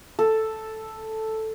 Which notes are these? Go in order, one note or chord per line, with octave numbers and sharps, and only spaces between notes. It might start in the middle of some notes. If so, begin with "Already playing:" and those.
A4